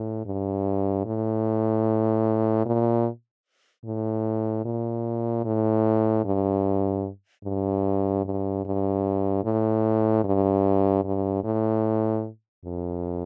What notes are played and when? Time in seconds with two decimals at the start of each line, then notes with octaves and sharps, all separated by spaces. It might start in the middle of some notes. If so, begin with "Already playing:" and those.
Already playing: A2
0.25 G2
1.05 A2
2.65 A#2
3.84 A2
4.65 A#2
5.45 A2
6.24 G2
7.44 G2
8.25 G2
8.65 G2
9.44 A2
10.24 G2
11.04 G2
11.44 A2
12.64 F2